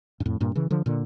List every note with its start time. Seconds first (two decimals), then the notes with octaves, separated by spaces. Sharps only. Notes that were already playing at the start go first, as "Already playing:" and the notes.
0.20 G2
0.26 F2 A2
0.40 G2 A#2
0.55 C#3 E3
0.71 D3 F3
0.86 A#2 D3